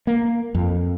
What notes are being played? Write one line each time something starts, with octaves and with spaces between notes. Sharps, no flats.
A#3
F2